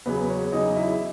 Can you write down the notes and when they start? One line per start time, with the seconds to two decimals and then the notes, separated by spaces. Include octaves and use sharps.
0.06 E2 C#3 F#3 B3 B4
0.29 C#4 C#5
0.52 E2 C#3 F#3 D#4 D#5
0.76 E4 E5